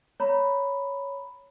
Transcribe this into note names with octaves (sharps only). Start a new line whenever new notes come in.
C#5 A#5 B5